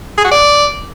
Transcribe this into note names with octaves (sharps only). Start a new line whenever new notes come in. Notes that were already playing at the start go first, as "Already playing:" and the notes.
G#4
F#4
D5